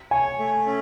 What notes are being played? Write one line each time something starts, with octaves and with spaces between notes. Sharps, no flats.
C#5 G#5
A3
C#4